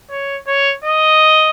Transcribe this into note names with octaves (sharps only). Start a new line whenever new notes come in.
C#5
C#5
D#5